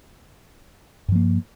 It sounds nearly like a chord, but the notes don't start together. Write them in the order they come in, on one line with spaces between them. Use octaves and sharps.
G2 F3 A#3